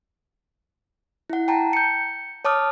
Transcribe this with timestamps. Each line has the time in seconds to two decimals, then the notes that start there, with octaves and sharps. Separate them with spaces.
1.30 E4 F#5
1.48 G5 A5 A#5
1.73 G6 C#7
2.45 C#5 A5 D6 D#6 F6